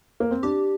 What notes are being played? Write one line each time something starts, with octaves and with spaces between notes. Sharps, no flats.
A#3
C4
D4 G4